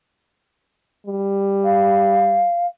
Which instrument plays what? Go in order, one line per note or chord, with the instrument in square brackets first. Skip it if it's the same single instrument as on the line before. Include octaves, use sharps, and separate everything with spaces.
[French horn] G3
[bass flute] F5